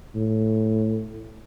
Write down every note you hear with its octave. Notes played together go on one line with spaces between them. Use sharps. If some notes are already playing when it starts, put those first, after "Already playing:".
A2